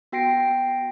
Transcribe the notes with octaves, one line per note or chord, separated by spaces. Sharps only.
B3 F#4 G5 A#6 C7 D7